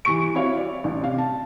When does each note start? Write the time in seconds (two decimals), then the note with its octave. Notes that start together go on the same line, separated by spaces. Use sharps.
0.05 E3 G3 C#6 D7
0.34 C4 E4 F#4 C#5 F5
0.57 D5
0.84 A1
1.03 C3 F5
1.18 A5